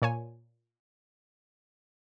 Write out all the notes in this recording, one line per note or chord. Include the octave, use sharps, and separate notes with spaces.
A#2 C#5 G#5